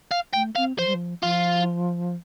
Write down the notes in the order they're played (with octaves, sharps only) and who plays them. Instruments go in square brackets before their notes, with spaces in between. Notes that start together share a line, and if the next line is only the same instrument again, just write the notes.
[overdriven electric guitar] F5
[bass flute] A3 [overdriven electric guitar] G5
[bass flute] C4 [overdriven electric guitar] F5
[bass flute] F3 [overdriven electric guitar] C5
[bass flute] G3
F3
[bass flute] F3 [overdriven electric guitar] F4